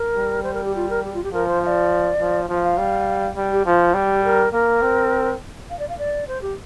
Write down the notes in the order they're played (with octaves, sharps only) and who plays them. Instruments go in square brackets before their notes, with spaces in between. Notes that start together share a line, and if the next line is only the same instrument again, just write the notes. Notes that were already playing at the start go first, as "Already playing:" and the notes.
Already playing: [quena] A#4
[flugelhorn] G3
[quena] C5
A#4
G4
F4
A#4
G4
F4
G4
[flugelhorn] F3 [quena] A#4
[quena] C5
F5
D5
[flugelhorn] F3
[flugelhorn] F3 [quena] F5
[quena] F5
[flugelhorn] G3
G3
[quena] G4
[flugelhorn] F3 [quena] F4
[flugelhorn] G3 [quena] G4
[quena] A#4
[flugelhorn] A#3 [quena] A#4
[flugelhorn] C4
[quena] F5
D5
F5
D5
C5
G4